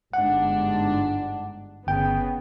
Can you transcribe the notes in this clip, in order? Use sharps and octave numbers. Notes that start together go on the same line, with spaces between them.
G1 G#2 D4 F#5
G1 C#3 B3 G5